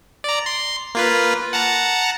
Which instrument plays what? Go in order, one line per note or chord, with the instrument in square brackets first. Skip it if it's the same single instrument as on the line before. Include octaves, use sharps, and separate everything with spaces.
[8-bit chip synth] D5 A#5
C6
A#3 F4 B4
F#5 A5 A#5